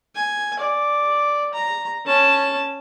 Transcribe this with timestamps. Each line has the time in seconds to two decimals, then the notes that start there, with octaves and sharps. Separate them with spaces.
0.15 G#5
0.59 D5
1.54 A#5
2.06 C#4 A5